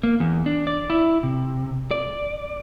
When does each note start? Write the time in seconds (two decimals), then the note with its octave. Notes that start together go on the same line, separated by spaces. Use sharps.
0.03 A#3
0.20 E2
0.46 D4
0.67 D5
0.90 E4
1.23 C3
1.91 D5